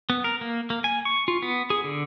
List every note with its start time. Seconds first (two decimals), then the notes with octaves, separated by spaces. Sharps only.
0.10 B3
0.24 A#4
0.41 A#3
0.70 A#3
0.84 G#5
1.05 C#6
1.28 F4
1.42 B3
1.70 G#4
1.84 D3